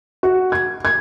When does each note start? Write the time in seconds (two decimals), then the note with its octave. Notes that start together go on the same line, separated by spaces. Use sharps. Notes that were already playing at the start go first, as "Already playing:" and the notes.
0.23 F#4
0.52 G#6
0.85 G#6